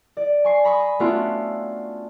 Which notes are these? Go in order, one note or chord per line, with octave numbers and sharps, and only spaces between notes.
D5
G#5 C#6 C7
A#5 B5 C#6 D#6
A3 B3 C#4 D4 F4 F#4